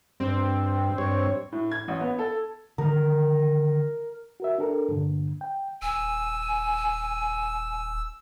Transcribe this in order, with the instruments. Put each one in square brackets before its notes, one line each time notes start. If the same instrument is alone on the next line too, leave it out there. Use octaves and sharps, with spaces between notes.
[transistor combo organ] G2 [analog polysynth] C4
[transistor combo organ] G2 C#5
[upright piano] A2
G#6
A1
B3
A4
[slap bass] D3 D#3 G3 [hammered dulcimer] A#4
[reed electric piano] F#4 A#4 E5
D4 G4 A4 A#4
G2 A#2 D3
G5
[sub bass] D#1 [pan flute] G#5 [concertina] E6